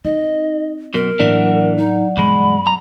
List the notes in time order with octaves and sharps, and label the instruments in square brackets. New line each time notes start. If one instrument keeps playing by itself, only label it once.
[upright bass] C4 [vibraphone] D#4 [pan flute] D#5
[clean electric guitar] F#2 B2 [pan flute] A#4
[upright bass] A2 [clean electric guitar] E3 A#3 D4 [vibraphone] F#3 D5 F#5
[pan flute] D#4
[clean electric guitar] B1 E2 G#3 [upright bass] G2 [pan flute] B5
[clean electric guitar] F#2 A#5